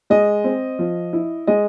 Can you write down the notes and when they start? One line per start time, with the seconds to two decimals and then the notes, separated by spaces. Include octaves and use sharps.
0.10 G#3 D#5
0.44 C4
0.79 F3
1.13 E4
1.47 G#3 D#5